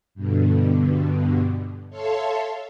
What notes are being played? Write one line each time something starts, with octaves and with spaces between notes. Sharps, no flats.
G2 B2 D3
A4 C#5 E5 F5 A5 C6